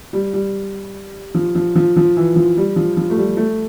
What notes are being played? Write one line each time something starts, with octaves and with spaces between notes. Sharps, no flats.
G3
G3
F3
F3
F3
F3
E3
F3
G3
F3
F3
A3
G3
A3